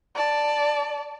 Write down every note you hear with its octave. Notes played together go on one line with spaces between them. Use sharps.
D5 A5